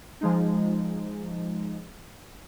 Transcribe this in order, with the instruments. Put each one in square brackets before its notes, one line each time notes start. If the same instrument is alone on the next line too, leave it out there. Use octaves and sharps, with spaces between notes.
[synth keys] F3 G#3 D#4